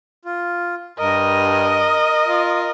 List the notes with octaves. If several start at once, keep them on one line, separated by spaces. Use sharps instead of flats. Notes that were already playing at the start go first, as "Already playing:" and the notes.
F4
G2 A#4 D#5
F4